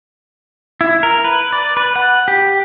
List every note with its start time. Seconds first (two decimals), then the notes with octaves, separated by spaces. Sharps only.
0.81 E4
1.03 A#4
1.24 B4
1.52 D5
1.77 B4
1.96 F#5
2.28 G4